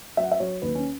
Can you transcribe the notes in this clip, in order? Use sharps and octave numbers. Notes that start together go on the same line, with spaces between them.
F#3 E5
F#5
E5
F#3 C#5
D#2 B4
C#4